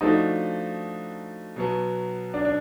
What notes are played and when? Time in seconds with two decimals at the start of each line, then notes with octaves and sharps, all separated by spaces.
0.01 F3 A3 D4 D#4 F#4 A4
1.56 B2 F#3 B3
2.34 D4
2.45 D4